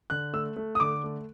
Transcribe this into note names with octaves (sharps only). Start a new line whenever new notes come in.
D3 F#6
A3 E6
A3
D#6
D3 D6
A3